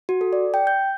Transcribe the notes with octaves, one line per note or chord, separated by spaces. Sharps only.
F#4
A4
D5
G5
G6